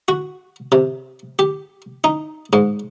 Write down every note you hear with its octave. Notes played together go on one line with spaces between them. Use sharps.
F#4
C3
G4
D#4
G#2